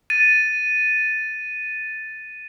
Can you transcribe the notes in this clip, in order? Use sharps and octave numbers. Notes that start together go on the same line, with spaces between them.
A6 D#7